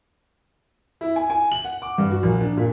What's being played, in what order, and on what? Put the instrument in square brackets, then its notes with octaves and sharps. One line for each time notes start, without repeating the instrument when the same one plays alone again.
[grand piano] E4
G#5
G#5
F#7
F#5
D6
G2
F#4
A#1
D4
A#2